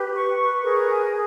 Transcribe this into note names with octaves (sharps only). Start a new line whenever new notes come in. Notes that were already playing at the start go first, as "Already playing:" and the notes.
Already playing: G4 B4
C#6
B4
G#4 A#4
G#5